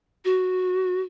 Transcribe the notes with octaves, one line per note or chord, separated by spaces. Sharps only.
F#4